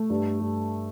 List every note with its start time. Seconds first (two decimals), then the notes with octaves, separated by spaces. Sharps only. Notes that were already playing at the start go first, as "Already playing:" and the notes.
Already playing: A3
0.10 G2
0.40 G2